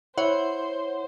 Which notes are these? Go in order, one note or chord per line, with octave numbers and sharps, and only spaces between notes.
E4 C5 C#5 F#5